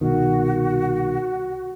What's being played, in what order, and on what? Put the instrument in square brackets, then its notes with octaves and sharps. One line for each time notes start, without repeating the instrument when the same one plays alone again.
[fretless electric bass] C2 B2 D#3 [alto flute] F#4